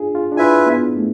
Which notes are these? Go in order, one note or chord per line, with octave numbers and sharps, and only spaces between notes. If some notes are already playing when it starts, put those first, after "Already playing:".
Already playing: D4 F4 G#4
F4
D4
E4 F4 B4 E5 G#5
B3
A3